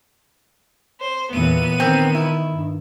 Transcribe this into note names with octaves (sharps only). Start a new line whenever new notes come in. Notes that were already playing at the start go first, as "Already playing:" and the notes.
C5
E2 A#2 E3 B3 D#7
D#3 C4 A#4
E4
G2